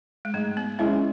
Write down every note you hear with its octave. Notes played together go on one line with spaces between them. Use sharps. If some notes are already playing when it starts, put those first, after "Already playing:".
G#3
G#2 A3
B3
G#3 B3 C#4 E4